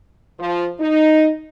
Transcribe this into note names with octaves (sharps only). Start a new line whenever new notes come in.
F3
D#4